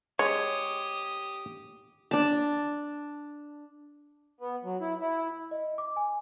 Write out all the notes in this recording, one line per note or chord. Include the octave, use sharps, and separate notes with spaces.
G#3 G4 C#5 D#6
D4 A5
B3
F#3
E4
E4
D#5
D6
G#5